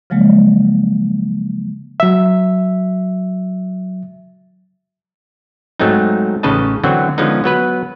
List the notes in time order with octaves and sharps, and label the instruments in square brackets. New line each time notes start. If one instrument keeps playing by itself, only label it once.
[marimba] C#3 F3 F#3 G#3 A#3
[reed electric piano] F#3 E5
[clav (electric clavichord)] G#2 F#3 A3 C4 D#4
A1 C#3 D#4 B4 D#5 A5
D3 E3 F#3 C4 F#4
D3 F3 G#3 B3 C#4 D#4
F#3 B3 B4